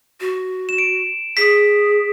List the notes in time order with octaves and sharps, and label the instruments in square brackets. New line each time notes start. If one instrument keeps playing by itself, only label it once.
[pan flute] F#4
[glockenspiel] E7
D7
[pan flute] G#4 [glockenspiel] B6